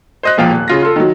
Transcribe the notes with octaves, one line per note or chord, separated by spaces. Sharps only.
C5 D#5 F#6
E1 A#2 F3 F5 G5
D#1
C#3 F4 A#6
F4 A4
D#3 F#3